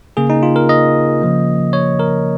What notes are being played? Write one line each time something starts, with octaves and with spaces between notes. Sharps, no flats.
C#3 A#3 G#4
D#4
F4
A#4
D#5
C#3 F3 A#3
C#5
A#4